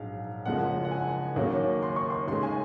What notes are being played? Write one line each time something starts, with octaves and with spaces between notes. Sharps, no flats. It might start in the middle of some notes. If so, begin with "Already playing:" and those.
Already playing: A#1 G#2 F#3 F5
F#1 F#2 F3 G#3 F#5
F#5
G#5
D#2 C#3 F#3 A#3
C6
C#6
C6
D#2 C#3 G#3 C6
G#5